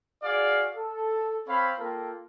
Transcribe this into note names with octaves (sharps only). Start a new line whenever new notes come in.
F#4 G#4 D5 F5
A4
C4 C#5 F5 B5
A#3 F4 A4 A#4 G5